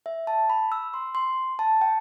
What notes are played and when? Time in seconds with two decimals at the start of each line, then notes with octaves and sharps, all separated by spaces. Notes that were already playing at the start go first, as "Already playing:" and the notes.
0.06 E5
0.27 A5
0.50 B5
0.72 E6
0.94 C6
1.15 C6
1.59 A5
1.81 G5